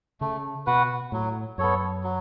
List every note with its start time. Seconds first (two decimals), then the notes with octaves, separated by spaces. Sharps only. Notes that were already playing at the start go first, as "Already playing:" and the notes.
0.21 C#3 A3
0.67 B2 F#4 B4 F#5
1.12 A2 F#3
1.58 F#2 B3 A4 C#5
2.04 F#3